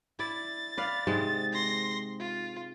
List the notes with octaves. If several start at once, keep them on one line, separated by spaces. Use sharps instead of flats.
E4 D5 A6
B4 D5 F5
G#2 C3 G#3
C6 A#6
F4